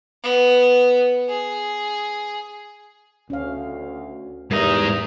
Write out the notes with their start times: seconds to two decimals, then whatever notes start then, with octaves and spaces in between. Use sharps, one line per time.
0.23 B3
1.29 G#4
3.30 D2 C#4 F5
4.51 E2 G#2 G3 D#4 A#4 E5 A#5